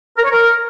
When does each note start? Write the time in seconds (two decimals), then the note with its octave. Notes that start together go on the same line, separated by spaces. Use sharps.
0.17 A#4
0.24 C#5
0.31 A#4